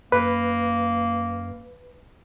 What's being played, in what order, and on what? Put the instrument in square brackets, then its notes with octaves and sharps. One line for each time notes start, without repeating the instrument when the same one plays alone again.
[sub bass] F#2 [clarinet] A#3 [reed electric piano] B4